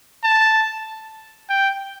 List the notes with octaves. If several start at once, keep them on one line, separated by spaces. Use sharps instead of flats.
A5
G5